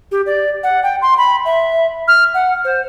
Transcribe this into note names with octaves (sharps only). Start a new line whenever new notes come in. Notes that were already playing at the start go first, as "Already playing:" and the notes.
G4
D5
F#5
G5
C6
B5
E5
F6
F#5
C5